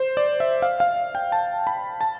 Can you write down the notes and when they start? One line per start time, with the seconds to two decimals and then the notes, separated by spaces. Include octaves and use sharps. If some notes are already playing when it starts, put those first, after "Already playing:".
Already playing: C5
0.17 D5
0.40 E5
0.62 F5
0.80 F5
1.15 G5
1.32 A5
1.67 B5
2.01 A5